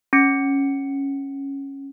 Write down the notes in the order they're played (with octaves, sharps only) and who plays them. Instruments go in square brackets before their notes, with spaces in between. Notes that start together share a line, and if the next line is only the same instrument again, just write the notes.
[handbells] C#4 C#7